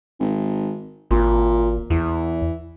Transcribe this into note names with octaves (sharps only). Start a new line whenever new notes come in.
G#1
G#1 A#2
E2 E3